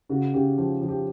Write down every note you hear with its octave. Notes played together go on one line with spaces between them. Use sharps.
C#3 F#4
C#3 G4
F3 G4
F3
G4